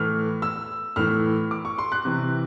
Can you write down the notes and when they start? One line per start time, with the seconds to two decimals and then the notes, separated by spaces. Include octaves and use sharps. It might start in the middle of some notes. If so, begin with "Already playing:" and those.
Already playing: A2 E3 F6
0.42 E6
0.96 A2 E3 F6
1.51 D6
1.65 C#6
1.78 C6
1.92 F#6
2.05 C3 E3